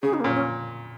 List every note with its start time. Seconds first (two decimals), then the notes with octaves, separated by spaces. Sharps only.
0.03 C#3 G#4
0.14 D#4
0.20 A#3
0.24 A#2 C#4
0.35 C#4